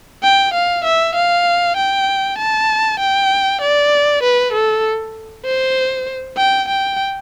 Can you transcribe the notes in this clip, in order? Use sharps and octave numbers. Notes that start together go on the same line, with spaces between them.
G5
F5
E5
F5
G5
A5
G5
D5
B4
A4
C5
G5
G5